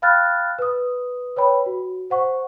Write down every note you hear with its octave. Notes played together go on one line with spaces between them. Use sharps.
F5 G5 B5 F6 F#6 A6
B4 D#6
B4 C#5 G5 B5
F#4
C5 F#5 C#6